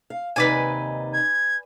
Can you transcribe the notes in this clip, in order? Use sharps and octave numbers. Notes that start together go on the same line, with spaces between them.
F5
D#2 C3 D#4 B4 D5 G#5
G#6